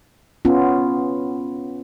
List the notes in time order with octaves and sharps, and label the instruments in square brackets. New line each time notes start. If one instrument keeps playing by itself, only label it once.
[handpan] B3 C#4 F4